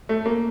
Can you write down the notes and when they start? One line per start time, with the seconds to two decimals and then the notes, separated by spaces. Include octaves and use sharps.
0.09 A3
0.26 A#3